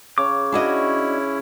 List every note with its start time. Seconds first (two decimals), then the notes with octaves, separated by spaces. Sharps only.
0.18 C#3 C#5 D6
0.52 C#4 D4 E4 F#4 D#5